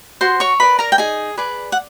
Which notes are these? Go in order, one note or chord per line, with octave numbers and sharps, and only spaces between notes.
F#4 C5 C6
C#5 C#6
A#4 B4 D5 B5
A#4 A#5
G5
D#4 G#4 G#5
G#4 B4 D5
F#5